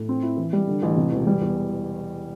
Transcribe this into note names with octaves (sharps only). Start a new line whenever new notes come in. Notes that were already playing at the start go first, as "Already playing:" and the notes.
Already playing: A2
C4
E4
E3
G3
D3
A1
C3
E1
G3
E2